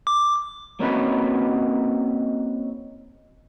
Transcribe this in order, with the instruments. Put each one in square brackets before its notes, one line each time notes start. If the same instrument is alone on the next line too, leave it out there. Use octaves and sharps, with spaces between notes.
[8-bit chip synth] D6
[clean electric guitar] A#3 C4 C#4 D#4 F#4 B4